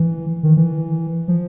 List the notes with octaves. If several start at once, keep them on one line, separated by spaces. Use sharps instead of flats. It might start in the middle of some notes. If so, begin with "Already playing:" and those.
Already playing: E3
D#3
E3
F3